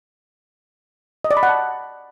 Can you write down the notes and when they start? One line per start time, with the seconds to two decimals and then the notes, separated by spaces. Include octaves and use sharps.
1.24 D#5
1.31 D5
1.37 B5
1.43 F#5
1.49 A5